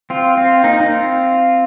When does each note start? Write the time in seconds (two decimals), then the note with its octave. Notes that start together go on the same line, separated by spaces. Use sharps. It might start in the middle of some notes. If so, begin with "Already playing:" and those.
0.10 C4 F4
0.37 C4 F4
0.64 A#3 D#4
0.80 D#4
0.90 C4 F4